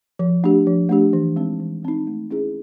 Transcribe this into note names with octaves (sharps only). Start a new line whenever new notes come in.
F3
A3 D4 G4
F3
A3 D4 G4
E3
G#3 C4 D#4
E3
G#3 C4 D#4
A3
C#4 E4 G#4